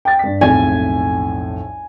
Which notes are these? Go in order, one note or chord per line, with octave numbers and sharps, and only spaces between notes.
G5 A6
G2 B6
B1 F2 A2 G#5